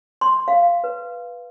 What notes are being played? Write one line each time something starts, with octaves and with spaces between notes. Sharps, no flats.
C6
F5
B4